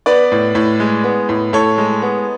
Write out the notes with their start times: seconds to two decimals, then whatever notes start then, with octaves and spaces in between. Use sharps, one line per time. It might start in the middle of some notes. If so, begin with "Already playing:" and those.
0.06 B3 B4 D5
0.32 A2
0.55 A2
0.80 G#3
1.04 B3
1.29 A2
1.53 A2 A4 C#5
1.78 G#3
2.02 B3